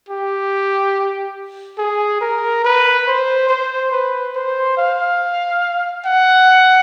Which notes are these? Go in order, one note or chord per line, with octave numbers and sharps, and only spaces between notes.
G4
G#4
A#4
B4
C5
C5
B4
C5
F5
F#5